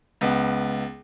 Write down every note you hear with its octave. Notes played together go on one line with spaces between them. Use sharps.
C#2 B3